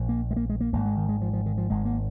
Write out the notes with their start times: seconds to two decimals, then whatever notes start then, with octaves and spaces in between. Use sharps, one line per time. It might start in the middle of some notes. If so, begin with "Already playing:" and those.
Already playing: A#1 A#2
0.09 A#3
0.31 G#3
0.36 A#3
0.49 G#3
0.61 A#3
0.73 G#1 G#2 A#3
0.85 G#3
0.97 D#3
1.09 G#3
1.21 F3
1.33 F3
1.46 D#3
1.58 F3
1.69 G#1 G#2 G#3
1.85 A#3